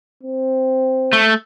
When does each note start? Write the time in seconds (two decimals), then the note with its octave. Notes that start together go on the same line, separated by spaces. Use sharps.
0.23 C4
1.13 A3